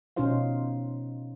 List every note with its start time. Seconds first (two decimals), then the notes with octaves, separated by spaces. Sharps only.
0.16 B2 C#4 D#4 F4 C5 F5